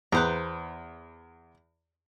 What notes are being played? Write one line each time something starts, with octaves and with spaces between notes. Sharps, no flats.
E2 B4 C5 A#5